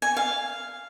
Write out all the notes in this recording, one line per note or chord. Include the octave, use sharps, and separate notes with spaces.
G#5
F5